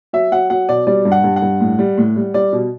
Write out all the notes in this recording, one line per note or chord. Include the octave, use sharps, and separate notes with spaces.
F#3 E5
F#3 F#5
F#3 F#5
B2 D5
G3 D5
G2
F#5
G2
F#5
G2
A2
G3
A2
G3
G3 D5
B2